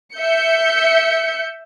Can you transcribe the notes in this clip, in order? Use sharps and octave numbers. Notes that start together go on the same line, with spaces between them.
E5 G6 C#7